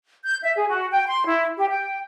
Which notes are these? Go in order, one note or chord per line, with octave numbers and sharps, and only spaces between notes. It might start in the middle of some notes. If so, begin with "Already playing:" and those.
G6
E5
G#4
F#4
G5
C6
E4
G4
G5